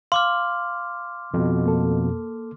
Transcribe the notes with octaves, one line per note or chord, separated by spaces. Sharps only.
F5 C6 D6 F6
F2 B2
A#3 A4